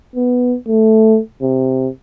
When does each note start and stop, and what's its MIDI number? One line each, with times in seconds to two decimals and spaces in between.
0.16 0.56 59
0.68 1.19 57
1.42 1.88 48